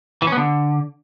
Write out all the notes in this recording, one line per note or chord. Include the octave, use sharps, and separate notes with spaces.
E3
C#4
B3
D3